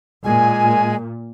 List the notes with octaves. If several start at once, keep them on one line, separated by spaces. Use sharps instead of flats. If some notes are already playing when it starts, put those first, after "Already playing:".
A#2 G#3 G#5